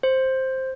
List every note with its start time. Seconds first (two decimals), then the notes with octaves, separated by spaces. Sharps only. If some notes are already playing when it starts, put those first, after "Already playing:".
0.03 C5